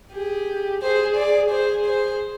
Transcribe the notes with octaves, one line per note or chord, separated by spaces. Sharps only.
G4 G#4
G#4 C5
D5
G#4 C5
C5